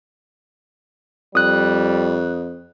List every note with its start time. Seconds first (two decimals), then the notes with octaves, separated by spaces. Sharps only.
1.35 F2 G3 D#6 F#6